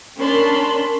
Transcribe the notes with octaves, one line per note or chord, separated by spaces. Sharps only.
C#4 D4 A#4 A5 B5 C6